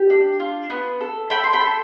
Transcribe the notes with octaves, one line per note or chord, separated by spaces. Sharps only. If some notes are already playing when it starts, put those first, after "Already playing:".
Already playing: G4
D4
F4
B3
A4
A4 G5 B5
C6
G5 B5
A4